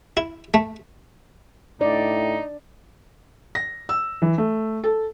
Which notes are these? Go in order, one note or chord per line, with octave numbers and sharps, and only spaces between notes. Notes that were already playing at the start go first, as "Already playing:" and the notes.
E4
A3
A2 D4 D#4 D5
A#6
E6
E3
A3
A4